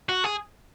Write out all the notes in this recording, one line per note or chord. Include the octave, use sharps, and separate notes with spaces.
F#4
G#4